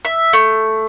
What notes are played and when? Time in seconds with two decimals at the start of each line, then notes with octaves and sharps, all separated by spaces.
0.05 E5
0.33 A3